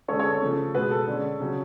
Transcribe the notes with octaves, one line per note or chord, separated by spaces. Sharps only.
D3 G#3 C#4 A4 C#5
A4 C#5
A4
C#3 F3 A3 C#4
B2 G#3 B3 B4
A4
D3 G#3 C#4
C#3 F#3 C#4